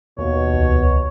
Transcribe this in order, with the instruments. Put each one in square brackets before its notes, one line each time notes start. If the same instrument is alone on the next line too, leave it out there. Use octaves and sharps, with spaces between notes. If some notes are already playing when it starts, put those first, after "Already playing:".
[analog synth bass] D#2 [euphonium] B2 [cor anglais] C#5
[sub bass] C#2